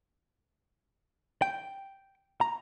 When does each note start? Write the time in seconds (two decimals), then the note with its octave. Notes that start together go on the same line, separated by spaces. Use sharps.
1.42 G5
2.41 A#5